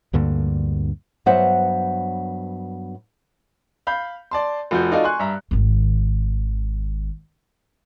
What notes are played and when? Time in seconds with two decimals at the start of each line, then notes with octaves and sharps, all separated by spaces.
0.13 D2 G2 D3 A#3
1.26 G2 F#3 B3 C5 E5 F#5
3.87 F5 B5 G6
4.31 D5 A5 C6
4.71 F1 F3 F#4 G6
4.92 D#4 F4 F#4 A4 D5 D#5
5.04 G#5 C6 C#6 F#6
5.19 G2 E5 A#5
5.51 G#1 D#3